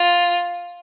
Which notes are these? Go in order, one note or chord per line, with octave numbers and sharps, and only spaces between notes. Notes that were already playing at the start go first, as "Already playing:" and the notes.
Already playing: F4